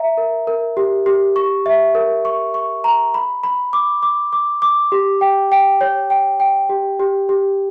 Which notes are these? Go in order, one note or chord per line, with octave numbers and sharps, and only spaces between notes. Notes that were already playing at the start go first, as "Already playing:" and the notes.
Already playing: E5 A#5
A#4
A#4
G4
G4
C#6
E5
A#4
C#6
C#6
A#5
B5
B5
D6
D6
D6
D6
G4
G5
G5
C#5
G5
G5
G4
G4
G4